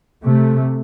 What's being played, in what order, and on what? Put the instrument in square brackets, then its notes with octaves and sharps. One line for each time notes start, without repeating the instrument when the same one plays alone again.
[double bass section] C3 A3